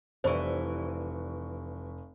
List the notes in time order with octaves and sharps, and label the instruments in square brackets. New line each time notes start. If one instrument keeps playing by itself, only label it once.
[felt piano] F1 C#6 [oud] E3 G3 [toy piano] C5